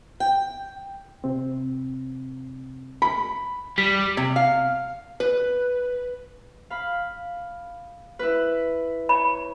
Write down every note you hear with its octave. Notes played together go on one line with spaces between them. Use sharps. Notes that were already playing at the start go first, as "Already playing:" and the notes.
G5
C3 C4
B5
E2 G3 B6
C3
F5
B4
F5 B5
E4 B4
C#5 B5